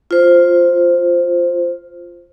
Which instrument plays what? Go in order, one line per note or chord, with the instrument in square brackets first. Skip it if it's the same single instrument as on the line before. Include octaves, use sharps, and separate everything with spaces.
[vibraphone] F4 C5